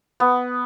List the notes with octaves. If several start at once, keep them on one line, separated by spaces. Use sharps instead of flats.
B3